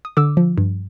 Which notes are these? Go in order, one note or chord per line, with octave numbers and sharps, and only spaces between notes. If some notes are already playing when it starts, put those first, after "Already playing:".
D#6
D3 D6 E6
F3
G2